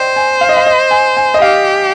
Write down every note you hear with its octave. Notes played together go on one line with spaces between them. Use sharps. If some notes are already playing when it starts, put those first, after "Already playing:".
Already playing: C5 D5 D#5 G5
G#5
F5
D#5
F5
D#5
G#5
G#5
D#5
G4 F5